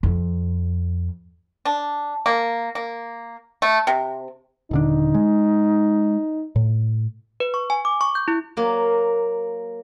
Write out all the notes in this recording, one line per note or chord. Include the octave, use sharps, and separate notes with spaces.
F2
D4
A#3
A#3
A3
C3
D#1 D3 D4 D#4
G#3
A2
B4
C#6
G#5
D6
C#6
G6
E4
F#3 A#3